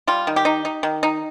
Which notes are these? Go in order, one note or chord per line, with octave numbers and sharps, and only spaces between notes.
G3 F4
D#3
G4
D#4
D#4
D#3
D#4